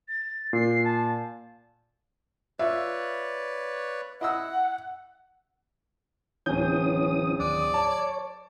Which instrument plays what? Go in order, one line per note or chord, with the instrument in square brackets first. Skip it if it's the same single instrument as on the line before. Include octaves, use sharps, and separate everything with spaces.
[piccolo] A6
[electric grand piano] A#2 [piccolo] C7
[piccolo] A5
[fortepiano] F4 [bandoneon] B4 C#5 D5 [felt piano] E5
[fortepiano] E4 D#5 E6 [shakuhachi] F#5
[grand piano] D1 G#5 G6 [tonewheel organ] E3 C#4 D#6
[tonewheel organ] D#2 D#6 [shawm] D5
[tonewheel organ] C#5 [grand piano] A5